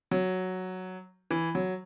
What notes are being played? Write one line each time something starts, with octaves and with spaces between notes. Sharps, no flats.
F#3
E3
F#3